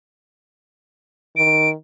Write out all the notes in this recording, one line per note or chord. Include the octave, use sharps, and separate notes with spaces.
D#3 D7